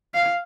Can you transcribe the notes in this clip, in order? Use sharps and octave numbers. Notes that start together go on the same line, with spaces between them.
F5